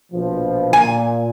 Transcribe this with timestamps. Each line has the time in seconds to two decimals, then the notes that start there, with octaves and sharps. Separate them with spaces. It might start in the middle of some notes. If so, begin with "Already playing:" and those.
0.12 A#1 B2 F3
0.73 A#2 G#5